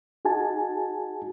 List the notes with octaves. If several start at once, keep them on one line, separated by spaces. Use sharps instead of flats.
D#4 F#4 G#4 G#5 A5